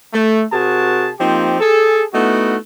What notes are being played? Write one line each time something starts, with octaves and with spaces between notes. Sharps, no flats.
A3
C3 F#4 G#4 A#4 A5
F3 A#3 C4 D#4 G4
G#4 A4
A3 B3 D#4 E4 F#4